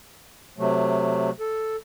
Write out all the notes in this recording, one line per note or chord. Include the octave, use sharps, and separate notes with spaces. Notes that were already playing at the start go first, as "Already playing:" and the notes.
C3 F#3 A3
A4